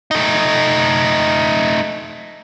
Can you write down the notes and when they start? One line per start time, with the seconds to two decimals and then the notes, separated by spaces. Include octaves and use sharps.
0.11 A3 D#4